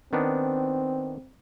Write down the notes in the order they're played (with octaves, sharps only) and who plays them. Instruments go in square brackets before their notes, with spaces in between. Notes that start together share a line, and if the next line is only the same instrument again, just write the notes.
[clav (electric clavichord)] D#3 B3 D4 [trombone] C4